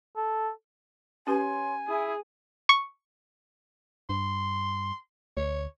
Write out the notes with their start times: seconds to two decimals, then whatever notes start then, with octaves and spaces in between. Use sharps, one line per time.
0.17 A4
1.27 C#4 G4 B4 C#5 G#5 C6
1.88 E4 G#4 D#6
2.69 C#6
4.09 G2 C6
5.37 D2 C#5